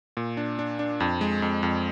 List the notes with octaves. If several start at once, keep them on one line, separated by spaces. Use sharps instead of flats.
A#2
D4
D4
D4
F2
G#3
F2
F2